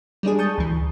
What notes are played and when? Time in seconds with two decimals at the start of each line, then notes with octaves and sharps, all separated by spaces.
0.23 G3 G#3 D4 G#4
0.38 A5 C#6 D#6 G6
0.58 D2 E3